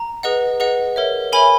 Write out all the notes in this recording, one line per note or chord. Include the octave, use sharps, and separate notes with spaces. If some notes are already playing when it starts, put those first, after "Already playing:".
Already playing: A#5
G#4 B4 D#5 F#5
G#4 B4 D#5 F#5
A#4 C#5 E5
A#4 C#5 E5 G#5 B5